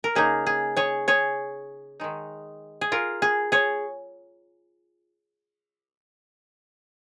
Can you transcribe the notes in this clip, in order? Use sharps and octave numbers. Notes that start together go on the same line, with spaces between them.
A#4
C#3 A#3 D#4 G#4
G#4
G#4 C#5
G#4 C#5
D#3 G#3 D#4
G#4
F4 A#4
G#4
G#4 C#5